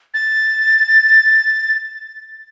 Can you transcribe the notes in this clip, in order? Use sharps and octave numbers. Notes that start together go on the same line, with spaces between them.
A6